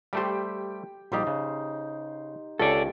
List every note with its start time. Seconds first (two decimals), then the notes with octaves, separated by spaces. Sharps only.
0.13 G3 A3 G4 C5 G5
1.12 A#1 G3 D#4 G4 C5
1.27 C#3
2.59 C#2 C#4 G4 A4 D5